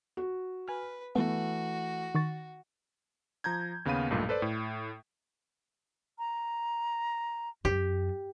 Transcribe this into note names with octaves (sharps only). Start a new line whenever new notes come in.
F#4
B4 G#5 F6
E3 A3 B3 F#4
D#3 C#6 A6
F3 A#5 G6 G#6
D#2 C#3 B3 F5 B5 D#7
B1 G2 A#2 A3
A4 B4 C5 D5
A2
A#5
F#2 G4